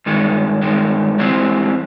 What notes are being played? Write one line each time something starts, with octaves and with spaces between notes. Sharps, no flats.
G2 D#3 G#3
G2 D#3 G#3
G#2 E3 G3 C4